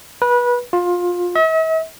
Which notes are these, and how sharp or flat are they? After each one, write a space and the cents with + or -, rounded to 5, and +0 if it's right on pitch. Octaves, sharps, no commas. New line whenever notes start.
B4 -25
F4 +20
E5 -45